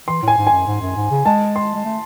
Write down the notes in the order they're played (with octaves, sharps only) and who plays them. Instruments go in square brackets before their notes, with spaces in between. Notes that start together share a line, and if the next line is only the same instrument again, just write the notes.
[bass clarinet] E3 [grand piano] C6
[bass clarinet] A2 [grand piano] G#5
[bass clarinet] G#2
[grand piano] G#5
[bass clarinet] F#2
G#2
F#2
G#2
C#3
[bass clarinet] G#3 [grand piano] A5
[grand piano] C6
[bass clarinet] G#3
A3